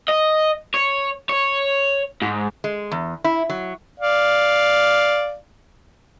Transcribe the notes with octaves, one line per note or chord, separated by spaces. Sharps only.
D#5
C#5
C#5
G#2
G#3
E2
E4
F#3
D5 F5